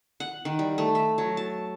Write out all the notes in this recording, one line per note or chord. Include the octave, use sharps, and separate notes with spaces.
F#5
D#3
G3
A3
E5
F#3
A5